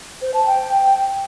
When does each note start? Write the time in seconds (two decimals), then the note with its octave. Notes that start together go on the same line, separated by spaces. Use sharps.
0.22 C5
0.34 A5
0.46 G5